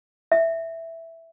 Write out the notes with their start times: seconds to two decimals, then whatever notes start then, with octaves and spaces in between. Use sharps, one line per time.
0.32 E5